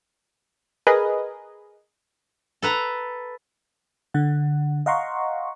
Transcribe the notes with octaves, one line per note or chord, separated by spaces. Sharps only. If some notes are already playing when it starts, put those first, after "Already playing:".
G#4 A#4 B4 D#5
A4 B4 A#5
D3 F#5
D#5 F5 F#5 A#5 C6 C#6